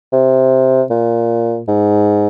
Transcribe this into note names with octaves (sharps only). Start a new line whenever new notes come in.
C3
A#2
G#2